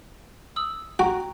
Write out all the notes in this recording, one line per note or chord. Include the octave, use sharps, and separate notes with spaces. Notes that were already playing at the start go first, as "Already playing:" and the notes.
D#6 E6 F#7
F#4 G5 A#5